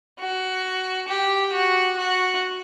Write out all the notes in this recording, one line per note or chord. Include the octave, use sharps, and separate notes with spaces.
F#4
G4
F#4
F#4